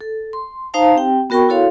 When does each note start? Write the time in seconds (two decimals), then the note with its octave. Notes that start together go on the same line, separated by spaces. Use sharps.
0.01 A4
0.33 C6
0.74 D#4 C5 F5 A5 A#5
0.95 C4 G4 G5
1.30 B3 F#4 A#4 G5 B5 C#6
1.49 E4 F#4 A4 C#5 F5 C6